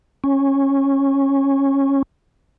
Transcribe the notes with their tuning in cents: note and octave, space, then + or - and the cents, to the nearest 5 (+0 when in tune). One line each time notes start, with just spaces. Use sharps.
C#4 -15